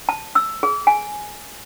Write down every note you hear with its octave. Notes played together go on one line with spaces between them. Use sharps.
A5
E6
G#4
G#5